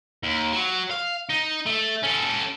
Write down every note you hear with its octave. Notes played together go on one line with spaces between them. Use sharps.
D#2
F#3
F5
D#4
A3
C#4 A4